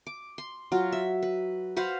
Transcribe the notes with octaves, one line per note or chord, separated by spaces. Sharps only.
D6
C6
F#3 F4
E5
B4
F#4 B4 C5 F5